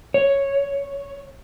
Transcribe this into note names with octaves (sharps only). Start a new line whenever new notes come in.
C#5